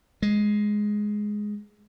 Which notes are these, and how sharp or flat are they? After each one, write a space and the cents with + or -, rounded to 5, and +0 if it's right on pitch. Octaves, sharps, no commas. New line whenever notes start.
G#3 +5